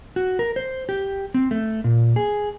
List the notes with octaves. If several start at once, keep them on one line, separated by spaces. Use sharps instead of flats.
F#4
A#4
C5
G4
C4
A3
A#2
G#4